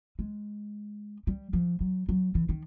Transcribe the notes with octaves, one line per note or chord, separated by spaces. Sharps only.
G#3
G3
F3
F#3
F#3
E3
D#3